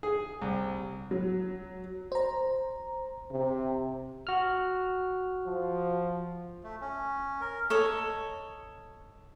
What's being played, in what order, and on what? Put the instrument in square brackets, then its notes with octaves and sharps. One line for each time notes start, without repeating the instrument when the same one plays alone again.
[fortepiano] G#4
C2
[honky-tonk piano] F#3
[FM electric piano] C5 A#5
[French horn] C3
[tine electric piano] F#4 F6
[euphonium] F3
[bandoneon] A3
C#4
A#4
[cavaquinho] A4 C#5 D#5